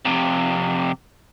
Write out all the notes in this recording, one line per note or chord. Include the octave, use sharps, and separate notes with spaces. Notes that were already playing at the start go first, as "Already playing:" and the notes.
F2 C3